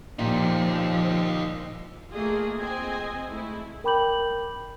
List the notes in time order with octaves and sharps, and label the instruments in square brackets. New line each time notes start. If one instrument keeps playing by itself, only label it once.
[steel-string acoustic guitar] A#2 [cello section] F3 [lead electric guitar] D#4 G4
[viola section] A3 A#3 F4 G#4 D#5
C4 D#5 G#5
G#3 A3 E4
[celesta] A#4 G5 B5 D6 G6 F#7